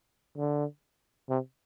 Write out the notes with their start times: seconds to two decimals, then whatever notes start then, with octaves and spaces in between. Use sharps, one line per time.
0.37 D3
1.29 C3